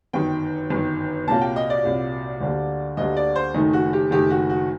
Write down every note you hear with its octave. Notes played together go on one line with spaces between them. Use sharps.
G1 F#2 D#3 G5
G1 F#2 D#3
C2 A#2 F#3 A#3 A5
G5
D#5
D5
C2 A#2 F#3 A#3
D2 D3 G3 A#3
D2 D3 G3 A#3 D#5
D5
C5
F#1 F#2 D#3 A3 D#4
F#4
G4
F#1 F#2 D#3 A3 G4
F#4
F#4